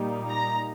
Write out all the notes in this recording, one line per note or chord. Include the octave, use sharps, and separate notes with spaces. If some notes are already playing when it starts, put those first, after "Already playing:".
Already playing: A#2 G3 A#3 D#4
A#5